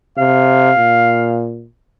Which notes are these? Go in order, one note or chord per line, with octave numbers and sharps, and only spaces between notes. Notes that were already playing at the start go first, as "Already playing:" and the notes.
C3 F5
A#2